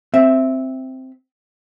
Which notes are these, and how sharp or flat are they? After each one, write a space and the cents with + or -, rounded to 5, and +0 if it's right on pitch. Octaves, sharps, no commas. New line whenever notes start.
C4 +0 E5 +5